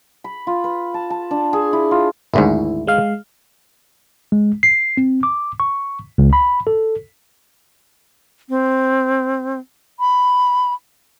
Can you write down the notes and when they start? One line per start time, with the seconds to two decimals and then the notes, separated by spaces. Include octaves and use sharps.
0.24 B5
0.47 F4
0.64 B4
0.94 A5
1.10 A5
1.31 D4
1.53 G#4
1.73 E4
1.91 F4
2.34 G#1 D2 G#2 E4
2.87 G#3 F5
4.32 G#3
4.63 C7
4.97 C4
5.23 D6
5.60 C#6
6.18 C#2
6.33 B5
6.67 A4
8.49 C4
9.99 B5